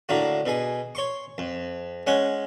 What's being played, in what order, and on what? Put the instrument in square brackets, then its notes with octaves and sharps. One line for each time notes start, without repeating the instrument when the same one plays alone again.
[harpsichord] A2 D3 A#3 F#4
B2 G#4
C#5 C6 C#6
F2
G#3 C#4 F#5